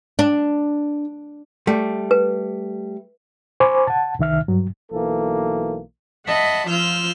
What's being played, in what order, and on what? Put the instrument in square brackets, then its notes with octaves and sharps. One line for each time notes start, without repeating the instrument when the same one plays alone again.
[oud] D4
[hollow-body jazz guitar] G3 A3
[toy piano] B4
[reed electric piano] C5 G#5 B5 C#6 D6
F#5 A5
C2 D#3 E5 F6
G2 F#3
[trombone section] B1 E3 A#3 A4
[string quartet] D#5 E5 F#5 A5 B5
F3 F4 E6 F6 G6